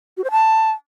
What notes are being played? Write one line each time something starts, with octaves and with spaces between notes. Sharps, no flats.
F#4
C5
A5